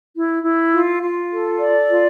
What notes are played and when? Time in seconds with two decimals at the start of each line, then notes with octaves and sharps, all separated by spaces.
0.14 E4
0.44 E4
0.72 F4
1.02 F4
1.31 A4
1.59 D5
1.89 F4